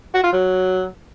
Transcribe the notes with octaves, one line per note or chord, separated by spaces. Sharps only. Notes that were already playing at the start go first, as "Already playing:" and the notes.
F#4
F4
F#3